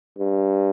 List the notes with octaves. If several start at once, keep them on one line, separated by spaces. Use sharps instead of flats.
G2